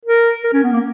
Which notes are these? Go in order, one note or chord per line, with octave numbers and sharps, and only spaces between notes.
A#4
A#4
C#4
B3
A#3